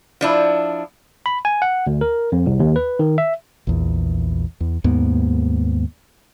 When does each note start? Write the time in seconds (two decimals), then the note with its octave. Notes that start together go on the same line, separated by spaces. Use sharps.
0.21 F3 D4 E4
1.26 B5
1.45 G#5
1.62 F#5
1.87 D2
2.01 A#4
2.32 F2
2.46 C2
2.60 D#2
2.76 B4
2.99 D#3
3.18 E5
3.67 A#1 E2
4.60 E2
4.84 D#2 G#2 A#3 B3